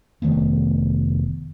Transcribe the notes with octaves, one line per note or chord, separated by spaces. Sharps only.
F1 D#3 A3 B3